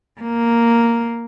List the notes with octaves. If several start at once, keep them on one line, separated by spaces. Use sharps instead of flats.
A#3